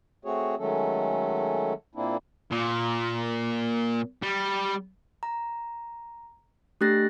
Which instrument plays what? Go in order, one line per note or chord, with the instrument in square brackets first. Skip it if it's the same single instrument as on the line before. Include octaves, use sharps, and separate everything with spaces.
[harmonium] A3 C4 F#4 G#4 C#5
D#3 F#3 G#3 A3 C#4 A4
A#2 A#3 C4 D4 E4
[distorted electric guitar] A#2
G3
[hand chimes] A#5
A3 D4 G4 F#6 A6 A#6